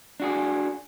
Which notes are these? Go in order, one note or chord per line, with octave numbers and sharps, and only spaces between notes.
D4 F#4 G#4